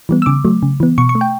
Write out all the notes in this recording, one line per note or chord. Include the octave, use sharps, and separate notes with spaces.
E3 G3 B3
E6
C#3 D6
F#3 A3
C#3
E3 B3
B2 C#6
C#6
A3
G5